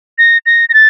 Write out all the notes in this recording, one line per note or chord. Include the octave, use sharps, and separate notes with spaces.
A#6
A#6
A#6
A6